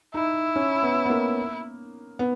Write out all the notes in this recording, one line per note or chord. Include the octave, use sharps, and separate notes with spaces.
D#4 E4
C#4
B3
B3
A#3
B3